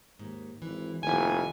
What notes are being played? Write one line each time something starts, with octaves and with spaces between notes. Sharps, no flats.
D#2 G#2
G#1 E3
F1 D#2 D#3 E4 G#5